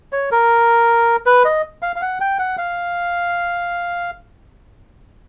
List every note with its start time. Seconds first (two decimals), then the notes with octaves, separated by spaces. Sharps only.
0.13 C#5
0.32 A#4
1.26 B4
1.45 D#5
1.82 F5
1.96 F5
2.02 F#5
2.21 G5
2.39 F#5
2.58 F5